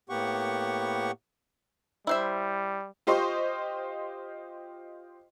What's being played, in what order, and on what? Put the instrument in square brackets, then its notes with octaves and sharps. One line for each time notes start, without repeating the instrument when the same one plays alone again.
[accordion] A2 A#3 B3 G4 F#5 C#6
[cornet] G3 [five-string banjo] E4 C5 E5
[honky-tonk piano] F4 G4 C5 D#5 C6 C#6